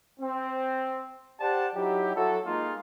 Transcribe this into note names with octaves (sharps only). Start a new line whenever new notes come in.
C4
G4 C5 D5 F#5 G5 A5
F#3 D#4 E4 G4
F#3 E4 F#4 A4
G#3 A#3 D#4 F4